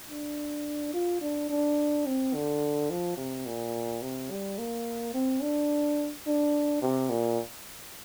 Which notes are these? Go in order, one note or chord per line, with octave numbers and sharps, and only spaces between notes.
D4
F4
D4
D4
C4
D3
F3
C3
A#2
C3
G3
A#3
C4
D4
D4
C3
A#2